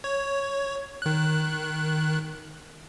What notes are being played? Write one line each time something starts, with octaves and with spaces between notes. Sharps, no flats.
C#5
D#3 F#6